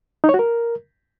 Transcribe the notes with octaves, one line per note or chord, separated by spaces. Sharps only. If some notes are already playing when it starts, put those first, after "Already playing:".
D#4
C#5
F#4
A#4